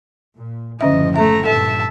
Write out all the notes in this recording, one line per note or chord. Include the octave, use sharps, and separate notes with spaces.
A#2
F#1 A2 D3 F3 C#4 D#5 E5
A3 E5 A#5
G2 A#2 A4 E5 A5